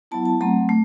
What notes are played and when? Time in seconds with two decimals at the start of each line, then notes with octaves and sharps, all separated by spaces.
0.11 F#3 B3 E4 A5
0.25 A5
0.41 F#3 A3 C4 A#5
0.69 A3